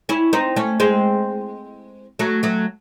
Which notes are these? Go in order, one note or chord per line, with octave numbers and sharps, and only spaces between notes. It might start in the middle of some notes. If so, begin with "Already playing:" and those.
C#4 E4
C4 D#4
A3 C#4
G#3 C4
F#3 A3
F#3 A3